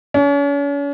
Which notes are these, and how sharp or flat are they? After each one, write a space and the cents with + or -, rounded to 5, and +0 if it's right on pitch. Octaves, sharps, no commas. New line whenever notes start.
C#4 +40